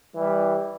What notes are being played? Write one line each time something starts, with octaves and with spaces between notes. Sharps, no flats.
E3 G3